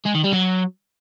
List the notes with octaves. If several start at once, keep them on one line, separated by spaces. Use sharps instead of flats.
G#3
D#3
G3
F#3